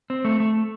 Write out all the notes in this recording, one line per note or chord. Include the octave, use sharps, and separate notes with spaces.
C4
A3
A3